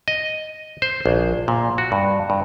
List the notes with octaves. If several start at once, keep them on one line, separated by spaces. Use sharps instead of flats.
D#5
C5
A#1
A#2
F#4
G2
G2